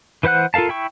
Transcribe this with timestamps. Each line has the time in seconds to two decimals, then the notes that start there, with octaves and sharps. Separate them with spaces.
0.23 E3 B4 C5 F#5 F#6
0.54 F4 A4 A#4 F5 A5
0.69 E4 G5 C#6